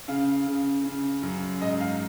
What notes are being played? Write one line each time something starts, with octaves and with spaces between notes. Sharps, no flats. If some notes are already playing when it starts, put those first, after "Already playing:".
C#3 F5
C#3
C#3
F#2
G#2 D#5
F5